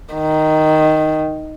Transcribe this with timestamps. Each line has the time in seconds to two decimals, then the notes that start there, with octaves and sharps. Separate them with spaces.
0.14 D#3